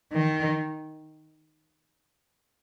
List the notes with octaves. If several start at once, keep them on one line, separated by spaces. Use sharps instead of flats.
D#3